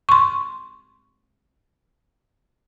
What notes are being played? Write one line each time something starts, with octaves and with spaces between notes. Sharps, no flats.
C6 C#6